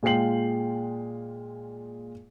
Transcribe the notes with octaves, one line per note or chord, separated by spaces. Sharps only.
A#2 G#3 F4 G5 C7 F#7